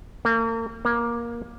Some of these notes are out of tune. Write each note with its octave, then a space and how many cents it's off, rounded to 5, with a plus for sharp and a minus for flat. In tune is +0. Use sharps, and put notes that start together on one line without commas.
A#3 -40
A#3 +15